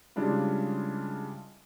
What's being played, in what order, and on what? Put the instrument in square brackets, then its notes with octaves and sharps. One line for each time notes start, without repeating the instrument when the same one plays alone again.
[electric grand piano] C#3 G3 G#3 D4 E4 F4